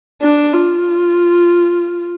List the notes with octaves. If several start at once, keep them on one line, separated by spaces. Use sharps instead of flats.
D4
F4